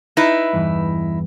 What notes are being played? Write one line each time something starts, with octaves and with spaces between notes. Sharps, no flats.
D#4 E4 B4
E2 G2